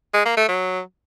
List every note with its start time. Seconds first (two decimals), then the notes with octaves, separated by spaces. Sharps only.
0.14 G#3
0.25 A#3
0.37 A3
0.48 F#3